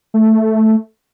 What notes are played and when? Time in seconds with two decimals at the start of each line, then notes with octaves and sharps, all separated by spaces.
0.14 A3